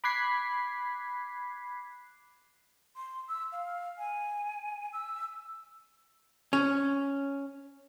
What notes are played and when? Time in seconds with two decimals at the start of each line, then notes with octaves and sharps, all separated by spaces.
0.04 B5 D6 F#6 G#6 B6 C7
2.96 C6
3.28 E6
3.52 F5
3.98 G#5
4.93 E6
6.53 C#4